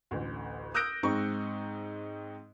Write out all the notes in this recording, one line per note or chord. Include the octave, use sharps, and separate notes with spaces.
A1 D2
D#6 E6 F#6 G6 A#6 D7
G#2 C4 D#4 C#6